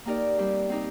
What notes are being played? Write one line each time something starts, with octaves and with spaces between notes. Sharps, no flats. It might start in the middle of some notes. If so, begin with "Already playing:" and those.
A#3 D#4 G4 A#4 D5
G3 C4 G4
C4 D#4 G4